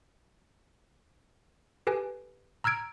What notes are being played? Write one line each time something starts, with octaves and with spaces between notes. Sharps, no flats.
G4 A4 B4 G#5
A#5 E6 F6 G#6 D7